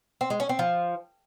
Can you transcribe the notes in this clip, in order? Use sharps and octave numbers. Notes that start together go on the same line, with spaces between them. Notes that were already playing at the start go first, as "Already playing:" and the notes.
C4
G#3
C#4
C4
F3